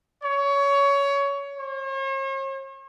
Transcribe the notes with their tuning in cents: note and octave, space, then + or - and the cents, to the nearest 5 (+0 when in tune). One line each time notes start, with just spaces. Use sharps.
C#5 +20
C#5 -45